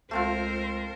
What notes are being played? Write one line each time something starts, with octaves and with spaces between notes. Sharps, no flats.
C#2 A3 C4 F4 A#4 C5